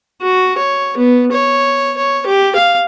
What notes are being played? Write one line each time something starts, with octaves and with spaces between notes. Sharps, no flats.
F#4
C#5
B3
C#5
C#5
G4
F5